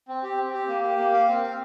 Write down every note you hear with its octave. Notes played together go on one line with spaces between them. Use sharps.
C4
G4
C4
G4
A#3
G4
A#3
F5
C4
F5